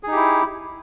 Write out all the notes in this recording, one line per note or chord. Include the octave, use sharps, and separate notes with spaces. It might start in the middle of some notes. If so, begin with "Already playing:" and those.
D#4 E4 G4 G#4